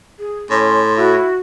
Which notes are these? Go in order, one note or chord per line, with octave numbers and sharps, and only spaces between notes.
G#4
A2 C#4 C6
E4 F#4